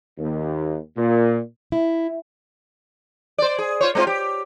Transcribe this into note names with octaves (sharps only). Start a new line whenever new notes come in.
D#2
A#2
E4
C5 D5
G#4
F4 C5 C#5
G#3 C4 F4
G4